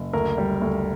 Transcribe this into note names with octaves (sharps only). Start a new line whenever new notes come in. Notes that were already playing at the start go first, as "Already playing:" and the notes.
Already playing: F#1
D2 A#4
G3
D2